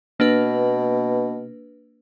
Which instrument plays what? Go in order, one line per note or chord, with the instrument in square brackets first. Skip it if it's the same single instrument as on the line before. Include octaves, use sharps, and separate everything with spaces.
[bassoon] B2 [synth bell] A#3 D4 B4